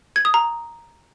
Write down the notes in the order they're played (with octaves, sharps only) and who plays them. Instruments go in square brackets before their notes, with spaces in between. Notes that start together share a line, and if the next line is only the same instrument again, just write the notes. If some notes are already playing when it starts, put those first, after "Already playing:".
[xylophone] G#6
D#6
A#5